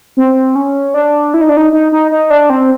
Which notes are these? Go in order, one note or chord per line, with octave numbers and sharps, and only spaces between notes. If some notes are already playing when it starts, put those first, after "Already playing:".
C4
C#4
D4
E4
D#4
D4
D#4
D#4
D#4
D#4
D4
C4